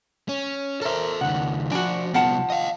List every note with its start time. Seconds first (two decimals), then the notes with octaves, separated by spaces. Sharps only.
0.29 C#4
0.82 A4 A#4 C5 E5
1.21 C#2 D#3 F#5
1.72 F3 D4 F#4 G#5
2.14 C2 F3 B3 F#5 A5
2.50 D#5 F5